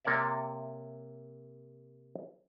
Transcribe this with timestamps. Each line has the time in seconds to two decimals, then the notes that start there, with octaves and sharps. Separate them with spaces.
0.05 C3 A#3 C#5 D5 E5